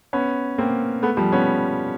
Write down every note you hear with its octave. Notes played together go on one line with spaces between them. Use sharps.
B3 C#4
A#3 C4
A3 B3
F3 G3
B3 C#4